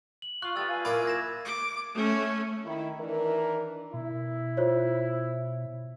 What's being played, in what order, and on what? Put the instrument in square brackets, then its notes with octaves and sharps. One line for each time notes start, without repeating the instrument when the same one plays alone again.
[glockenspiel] F#7
[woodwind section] F4 [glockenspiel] C#6 F#6
[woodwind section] G3 A3 B3 [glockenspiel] E6 F6 A6
[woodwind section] F4 B4 G#5
[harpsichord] A#2 E4 D6 [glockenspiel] B5
[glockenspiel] G#6 A#6 E7
[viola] D6
A3 C#4
[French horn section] D#3 E4
D#3 E3 D4 A#4
[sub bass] B2 [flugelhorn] E4
[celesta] F4 C5 C#5